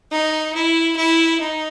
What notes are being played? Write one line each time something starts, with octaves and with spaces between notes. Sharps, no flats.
D#4
E4
E4
D#4